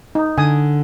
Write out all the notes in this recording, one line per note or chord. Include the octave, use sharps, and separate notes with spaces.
D#4
D3 G#5 D#6